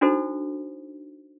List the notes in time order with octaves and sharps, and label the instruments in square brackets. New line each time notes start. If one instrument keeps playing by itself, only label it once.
[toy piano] D4 D#4 F#4 A4 C5